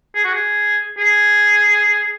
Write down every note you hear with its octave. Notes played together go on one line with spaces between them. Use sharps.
G#4
F#4
G#4
G#4